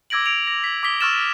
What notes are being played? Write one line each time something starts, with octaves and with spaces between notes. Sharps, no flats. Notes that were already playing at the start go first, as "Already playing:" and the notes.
D6 E6 G#6 A#6 D7 F#7
D7 F7
A#6
B6 F#7
D6 D#6 B6 G7
C#6 E6 F6 A6 E7